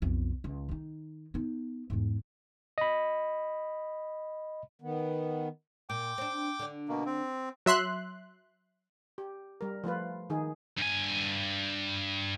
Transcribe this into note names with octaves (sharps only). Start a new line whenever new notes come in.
B1 F2
C#2
D#3 D#4
B3 D#4
E2 G#2
D#5 B5
D#3 B3
A#2 G5 D6
C4 D4
D3 D4
B2 A#3
C4
F#3 E5 C6 F#6
G4
G3 A#4
F3 A3 F4 B4
D#3 D#4 G#4
G2 G#5